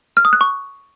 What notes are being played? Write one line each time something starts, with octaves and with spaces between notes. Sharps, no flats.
F6
D#6
F#6
C#6